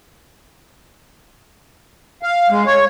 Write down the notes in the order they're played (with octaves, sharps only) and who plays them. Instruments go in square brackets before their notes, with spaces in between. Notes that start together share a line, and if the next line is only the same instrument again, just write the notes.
[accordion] F5
G#3
C#5